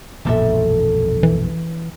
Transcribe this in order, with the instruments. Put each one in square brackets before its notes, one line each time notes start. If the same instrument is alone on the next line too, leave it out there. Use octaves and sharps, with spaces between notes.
[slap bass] E1 A#1 F#2 [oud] A#2 A4 E5
[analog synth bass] E3